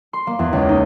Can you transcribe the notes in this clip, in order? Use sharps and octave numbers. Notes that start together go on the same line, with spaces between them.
C6
A#3
E2
C#2
D#4